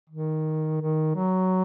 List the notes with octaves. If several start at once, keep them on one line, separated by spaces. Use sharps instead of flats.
D#3
D#3
F#3